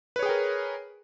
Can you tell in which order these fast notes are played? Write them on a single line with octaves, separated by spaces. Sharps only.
B4 C#5 G#4 G5 A#4